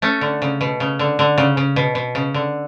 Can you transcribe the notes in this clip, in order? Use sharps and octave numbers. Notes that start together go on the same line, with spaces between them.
A3 C#4
D3
C#3
B2
C#3
D3
D3
C#3
C#3
B2
B2
C#3
D3